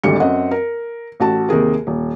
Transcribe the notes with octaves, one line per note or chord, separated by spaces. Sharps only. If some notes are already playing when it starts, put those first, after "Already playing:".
G#1 D2 G3 C#7
F#2 C4 D#5 F#5
A#4
A1 F#4 A5
D#2 C3 G#4 A#4
D#1